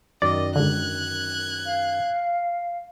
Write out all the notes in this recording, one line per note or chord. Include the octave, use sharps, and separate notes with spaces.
F#2 D#3 D5 D#5
G#2 D3 F#6 G#6
F5